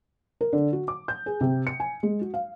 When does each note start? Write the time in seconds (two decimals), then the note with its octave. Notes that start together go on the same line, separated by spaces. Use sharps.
0.41 A#4
0.53 D3
0.73 F#4
0.88 D6
1.08 G6
1.26 G#4
1.41 C3
1.67 C#7
1.80 G#5
2.03 G#3
2.21 F#4
2.34 F5